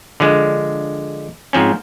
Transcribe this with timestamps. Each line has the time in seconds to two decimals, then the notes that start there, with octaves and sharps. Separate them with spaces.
0.20 D3 F3 G#3
1.53 G#2 F3 C4 C#4